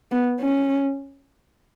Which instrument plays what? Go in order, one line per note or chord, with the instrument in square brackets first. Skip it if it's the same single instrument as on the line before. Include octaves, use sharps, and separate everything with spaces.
[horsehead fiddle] B3
C#4